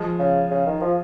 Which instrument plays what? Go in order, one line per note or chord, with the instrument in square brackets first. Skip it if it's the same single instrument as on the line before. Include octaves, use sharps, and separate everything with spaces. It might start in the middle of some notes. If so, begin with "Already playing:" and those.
Already playing: [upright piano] F3 G#3
[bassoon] C#3
C#3
D#3
F3